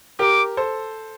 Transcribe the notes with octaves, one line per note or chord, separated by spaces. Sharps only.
G4 A#4 D6
A4 C5